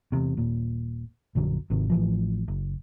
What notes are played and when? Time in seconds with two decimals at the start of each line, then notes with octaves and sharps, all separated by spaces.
0.12 E2 C3
0.37 D#1 A#2
1.35 A#1 F#2 D3 F#3
1.70 G#1 C3 D#3
1.89 A1 E3 F3
2.48 F#1